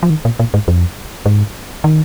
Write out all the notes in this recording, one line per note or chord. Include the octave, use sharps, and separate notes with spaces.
F3
D#3
A#2
A#2
G#2
F2
G#2
D#3